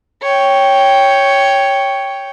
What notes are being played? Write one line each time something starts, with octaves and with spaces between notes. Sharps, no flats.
C#5 G5